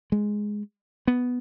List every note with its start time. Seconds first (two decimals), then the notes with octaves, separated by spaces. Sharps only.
0.12 G#3
1.08 B3